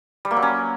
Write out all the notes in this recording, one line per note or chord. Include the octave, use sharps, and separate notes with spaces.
G3
A#3
F#3
C#4